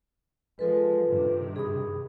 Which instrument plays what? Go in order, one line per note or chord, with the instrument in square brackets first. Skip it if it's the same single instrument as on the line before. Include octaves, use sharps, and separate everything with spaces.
[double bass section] F3 G#3 [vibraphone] F4 A4 B4
[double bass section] G2 C3 D#3
[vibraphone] G#4 B5 D#6